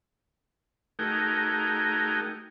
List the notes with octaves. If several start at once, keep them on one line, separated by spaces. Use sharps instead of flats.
A3 D#4 F#4 G#4 A#4 G5